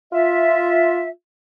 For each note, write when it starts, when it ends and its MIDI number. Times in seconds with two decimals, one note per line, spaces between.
0.12 1.08 65
0.12 1.08 76